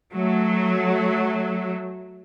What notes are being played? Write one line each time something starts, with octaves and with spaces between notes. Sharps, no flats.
F#3 A3